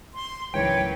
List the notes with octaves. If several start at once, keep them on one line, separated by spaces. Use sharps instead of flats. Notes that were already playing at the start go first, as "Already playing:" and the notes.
C6
C#2 G#2 E3 F#3 A#3 B4 C#5 G5